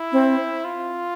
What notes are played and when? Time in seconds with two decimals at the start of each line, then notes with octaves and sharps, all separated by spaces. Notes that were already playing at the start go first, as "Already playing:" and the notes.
Already playing: E4
0.12 C4
0.64 F4